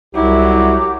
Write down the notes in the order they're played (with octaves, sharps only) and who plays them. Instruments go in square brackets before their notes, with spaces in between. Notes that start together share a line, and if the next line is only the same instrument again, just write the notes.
[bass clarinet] C2 [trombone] F#3 [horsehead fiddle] E4 [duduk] G4